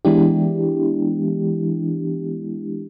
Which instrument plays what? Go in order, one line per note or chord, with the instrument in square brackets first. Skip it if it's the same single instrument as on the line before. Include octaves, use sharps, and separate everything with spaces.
[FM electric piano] E3 G#3 B3 D4 E4 G4